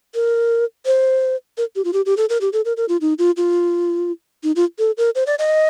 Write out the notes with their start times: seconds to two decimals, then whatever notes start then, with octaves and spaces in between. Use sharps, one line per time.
0.15 A#4
0.86 C5
1.58 A#4
1.76 G4
1.84 F4
1.93 G4
2.06 G4
2.17 A4
2.29 A#4
2.41 G4
2.53 A4
2.65 A#4
2.77 A#4
2.89 F4
3.01 D#4
3.19 F4
3.37 F4
4.43 D#4
4.56 F4
4.79 A4
4.98 A#4
5.15 C5
5.27 D5
5.39 D#5